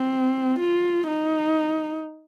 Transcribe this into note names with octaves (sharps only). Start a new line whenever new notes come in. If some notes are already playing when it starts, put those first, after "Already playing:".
Already playing: C4
F4
D#4